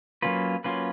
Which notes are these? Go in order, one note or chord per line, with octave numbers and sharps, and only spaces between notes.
F#3 A#3 C#4 F4 B4
F#3 A#3 C#4 F4 B4